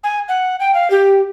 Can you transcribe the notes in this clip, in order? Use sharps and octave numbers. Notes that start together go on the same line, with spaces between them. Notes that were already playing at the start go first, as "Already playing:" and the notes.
G#5
F#5
G5
F5
G4